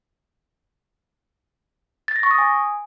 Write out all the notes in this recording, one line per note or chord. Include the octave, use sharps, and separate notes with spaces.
A6
A#6
C#6
D#6
G#5